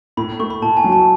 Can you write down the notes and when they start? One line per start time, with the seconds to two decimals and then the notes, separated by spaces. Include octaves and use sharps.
0.17 A2 B5
0.39 A3 C#6
0.50 B5
0.62 A2 A5
0.77 G#5
0.84 F#3
0.92 A5